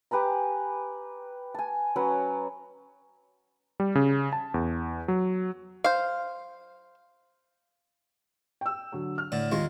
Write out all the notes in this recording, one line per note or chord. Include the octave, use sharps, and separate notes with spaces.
G4 B4 G#5 A#5
G#5 A5
F#3 C#4 B4
G3
C#3
A5
E2
F#3
C5 F5
G5 E6
D3 F#3
F6
A2 D3
D#2 G#3 F4